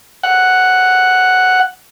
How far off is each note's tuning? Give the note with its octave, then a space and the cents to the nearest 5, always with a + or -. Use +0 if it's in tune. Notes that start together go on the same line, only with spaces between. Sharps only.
F#5 +0